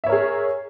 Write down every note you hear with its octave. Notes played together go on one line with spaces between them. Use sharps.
G#4 A#4 C#5 E5